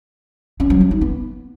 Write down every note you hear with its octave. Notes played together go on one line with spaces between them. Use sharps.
C#4
F#3
D4
D#4
B3